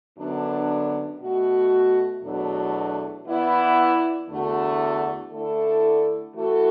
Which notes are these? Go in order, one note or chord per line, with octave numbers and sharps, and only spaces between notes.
F#2 D3 B3 D4
B2 A3 F#4
E2 B2 F#3 A3 D4
E3 B3 E4 D5
E2 D3 A3 F#4
D3 A3 E4 A4
E3 A3 F#4 A4